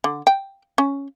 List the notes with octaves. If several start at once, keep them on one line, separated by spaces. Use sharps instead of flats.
D3
G5
C#4